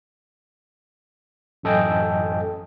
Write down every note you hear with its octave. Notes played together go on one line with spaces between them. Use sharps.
A1 F#2 A4 D#5 G5 G#5